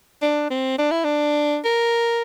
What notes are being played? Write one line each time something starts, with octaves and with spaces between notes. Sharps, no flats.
D4
C4
D4
E4
D4
A#4